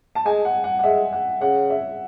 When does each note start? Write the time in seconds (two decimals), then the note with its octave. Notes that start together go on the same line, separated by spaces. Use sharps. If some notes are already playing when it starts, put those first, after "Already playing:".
0.15 A5
0.26 G#3 G#5
0.45 F#5
0.64 F#5
0.79 F#5
0.83 G#3 E5
1.13 F#5
1.41 C#3 F#5
1.70 E5